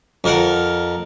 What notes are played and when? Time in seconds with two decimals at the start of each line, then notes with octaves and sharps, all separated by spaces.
0.24 F2 A#4 F#5